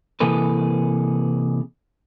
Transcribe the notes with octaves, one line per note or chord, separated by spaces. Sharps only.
C3 E3 A#3 G#4 A4 B4